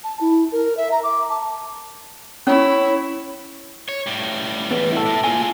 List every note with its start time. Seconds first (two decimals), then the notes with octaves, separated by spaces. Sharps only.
0.04 A5
0.21 E4
0.52 A#4
0.77 E5
0.92 A#5
1.04 D6
1.29 A5
2.47 C#4 E4 C#5
3.89 C#5
4.07 A2 G3
4.71 E2 B3
4.92 E4 A4
5.06 A2
5.24 A#2 F4 G#4 G#5